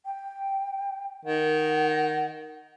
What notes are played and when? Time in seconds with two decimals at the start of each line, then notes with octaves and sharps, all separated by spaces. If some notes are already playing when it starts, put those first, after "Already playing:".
0.05 G5
1.25 D#3 F#5